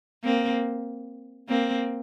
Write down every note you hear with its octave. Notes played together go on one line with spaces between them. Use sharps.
A#3 C4
A#3 C4